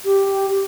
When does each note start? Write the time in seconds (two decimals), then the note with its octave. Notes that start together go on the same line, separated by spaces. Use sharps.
0.05 G4